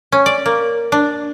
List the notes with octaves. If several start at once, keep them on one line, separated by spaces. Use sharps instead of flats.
C#4
D5
A#3
D4